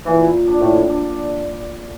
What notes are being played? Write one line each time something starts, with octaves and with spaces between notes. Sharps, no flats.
A#2 E3
D4
A2
D4